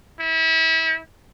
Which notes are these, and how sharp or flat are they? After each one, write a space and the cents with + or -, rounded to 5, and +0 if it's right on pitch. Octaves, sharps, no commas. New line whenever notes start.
E4 -30